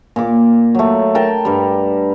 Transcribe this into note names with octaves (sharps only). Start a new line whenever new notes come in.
A#2 D6
F#3 A3
A#4 G5 A5
G2 G3